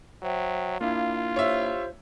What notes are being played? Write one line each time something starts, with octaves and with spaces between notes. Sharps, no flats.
F#3 C5 E5 G5
A#3 D4 E4 F4 F5
G4 C5 C#5 E5